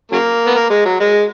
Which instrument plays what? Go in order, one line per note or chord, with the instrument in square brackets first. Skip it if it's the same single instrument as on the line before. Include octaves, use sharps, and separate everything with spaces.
[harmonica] C#3 F#3 A#3
B3
A#3
G#3
F#3
G#3